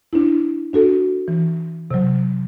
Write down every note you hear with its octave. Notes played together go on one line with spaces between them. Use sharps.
D4 E4
D4 F#4 A4
E3
C3 F#3